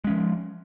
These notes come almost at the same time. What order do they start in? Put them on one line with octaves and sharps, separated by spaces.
G#3 C#4 F3